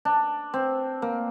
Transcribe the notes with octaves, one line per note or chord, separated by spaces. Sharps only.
D4
C4
A#3